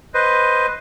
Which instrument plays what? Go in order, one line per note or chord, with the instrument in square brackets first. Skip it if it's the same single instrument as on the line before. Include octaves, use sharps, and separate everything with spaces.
[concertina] B4 C5 D#5